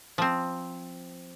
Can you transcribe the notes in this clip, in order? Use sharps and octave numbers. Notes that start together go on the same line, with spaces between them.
F3 C4